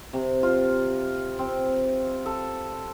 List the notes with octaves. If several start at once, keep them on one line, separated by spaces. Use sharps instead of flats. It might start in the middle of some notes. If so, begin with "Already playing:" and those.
C3
F4
C4
A4